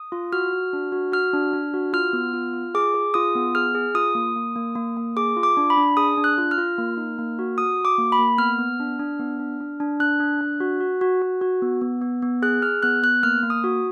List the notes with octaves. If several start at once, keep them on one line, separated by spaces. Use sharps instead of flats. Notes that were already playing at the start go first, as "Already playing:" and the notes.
Already playing: D#6
F4
F#4 F6
F#4
D4
F#4
F#4 F6
D4
D4
F#4
F4 F6
B3
F4
F4
G#4 D6
G#4
F4 D#6
B3
G#4 F6
G#4
F4 D#6
A#3
A#3
A#3
A#3
A#3
G#4 D6
F4
D6
D4
B5
D4
G#4 D#6
D4
F#6
F4
F6
F4
A#3
D#4
A#3
F#4
F#4 D#6
F#4
D6
A#3
B5
A#3
B3 F6
B3
D4
D4
B3
D4
D4
D4
D4 F#6
D4
D4
F#4
F#4
F#4
F#4
F#4
B3
B3
B3
B3
G#4 F#6
G#4 F6
B3 F#6
B3 F#6
A#3 F6
A#3
D#6
F#4